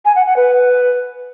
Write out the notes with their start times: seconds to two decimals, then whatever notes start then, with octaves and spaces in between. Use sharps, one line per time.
0.05 G#5
0.16 F#5
0.26 F#5
0.36 B4